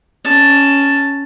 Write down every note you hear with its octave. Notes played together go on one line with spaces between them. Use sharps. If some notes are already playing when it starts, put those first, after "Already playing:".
C#4 A5